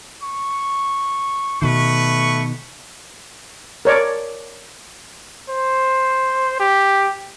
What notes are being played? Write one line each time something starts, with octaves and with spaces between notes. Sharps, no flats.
C#6
B2 D#3 A3 B4 C#6
A#4 C#5 D5
C5
G4